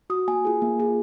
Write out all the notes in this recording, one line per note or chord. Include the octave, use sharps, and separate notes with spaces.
F#4 D#6
A#3 G#5
F4 G#4
A#3
F4 G#4